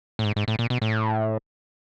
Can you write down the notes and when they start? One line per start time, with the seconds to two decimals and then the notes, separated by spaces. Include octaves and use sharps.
0.19 A2
0.24 G#2
0.36 G#2
0.48 A2
0.59 A#2
0.70 B2
0.82 A2